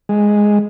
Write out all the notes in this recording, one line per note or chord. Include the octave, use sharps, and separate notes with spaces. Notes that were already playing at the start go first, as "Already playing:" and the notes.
G#3